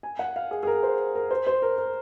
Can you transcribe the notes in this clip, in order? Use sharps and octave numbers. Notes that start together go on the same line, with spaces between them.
G#5
F#5
F5
G#4
G#4
A#4
C5
A#4
C5
C5
A#4
A#4